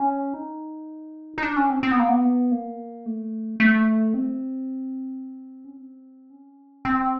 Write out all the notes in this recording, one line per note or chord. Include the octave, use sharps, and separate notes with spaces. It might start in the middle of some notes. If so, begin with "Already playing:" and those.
Already playing: C#4
D#4
D#4
D4
C#4
C4
C4
B3
A#3
B3
A#3
A3
A3
C4
C#4
C4
C#4
C4